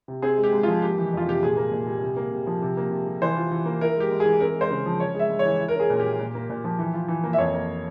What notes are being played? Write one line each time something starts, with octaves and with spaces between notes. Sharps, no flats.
C3
C4 G#4
G#3
G4
G#2
F3 F4
A#3 G4
E3
F2 F4
C3 G4
A#2 G#4
A#3
A#2
G3
C3
A#3
C3
F3
C3
A#3
C3
G3
E3 C5
F4
E3
A#3
E4 A#4
G#3 G4
G#2
G#4
E3
C4 A#4
G#3 C5
C#3
F3
C#4 C#5
G#3 E5
G#2
C#5
E3
E4
A#4
C#4 G#4
A#2
G3 G4
A#2
A#3
A#2
F3
E3
F4
E3
A#3
E5
F2 C#5
A#3